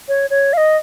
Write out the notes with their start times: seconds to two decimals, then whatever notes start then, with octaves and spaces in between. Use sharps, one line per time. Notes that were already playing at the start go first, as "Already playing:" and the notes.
0.08 C#5
0.30 C#5
0.53 F5
0.57 D#5